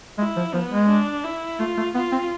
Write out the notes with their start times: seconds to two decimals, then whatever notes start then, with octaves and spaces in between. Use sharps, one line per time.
0.18 G#3 E4
0.36 F3
0.54 F3 B3
0.72 G#3
0.89 D4
1.24 E4
1.59 A3 F4
1.77 A3
1.95 B3 F4
2.12 C4